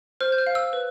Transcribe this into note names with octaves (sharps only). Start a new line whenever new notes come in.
C5 F6
G6
F6
F5
E6
B4